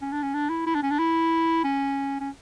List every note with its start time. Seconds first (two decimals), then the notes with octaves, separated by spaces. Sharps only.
0.02 C#4
0.12 D4
0.23 C#4
0.34 D4
0.50 E4
0.67 E4
0.75 D4
0.83 C#4
0.91 D4
0.99 E4
1.64 C#4
2.21 C#4